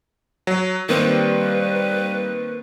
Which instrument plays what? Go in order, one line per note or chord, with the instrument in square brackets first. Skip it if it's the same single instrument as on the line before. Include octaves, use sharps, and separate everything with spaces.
[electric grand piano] F#3
[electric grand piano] D#3 A#3 C4 [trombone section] G3 [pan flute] B4